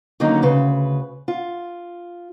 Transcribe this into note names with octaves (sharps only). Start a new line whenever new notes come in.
D3 D#3 F#3 A#3 C#4 D#4
D2 C#3 B4
F4